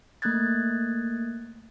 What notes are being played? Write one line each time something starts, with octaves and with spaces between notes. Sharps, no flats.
A3 A#3 D#6 F#6 G#6 A6